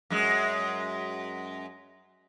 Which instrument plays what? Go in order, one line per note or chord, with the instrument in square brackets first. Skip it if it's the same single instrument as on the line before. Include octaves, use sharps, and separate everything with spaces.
[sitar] F#2 G#3